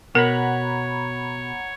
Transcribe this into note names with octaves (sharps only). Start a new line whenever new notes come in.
B2 A#4 C#5 F#5 A#5 B5